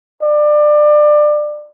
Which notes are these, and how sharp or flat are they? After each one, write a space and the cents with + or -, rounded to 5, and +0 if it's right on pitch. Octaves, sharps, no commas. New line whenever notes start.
D5 +25